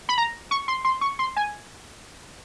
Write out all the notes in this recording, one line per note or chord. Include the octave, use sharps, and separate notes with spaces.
B5
A#5
C#6
C6
C6
C#6
C6
G#5